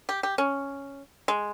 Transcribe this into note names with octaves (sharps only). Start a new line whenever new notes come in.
G4
G4
C#4
G#3